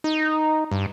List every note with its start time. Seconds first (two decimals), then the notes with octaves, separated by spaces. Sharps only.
0.04 D#4
0.71 G2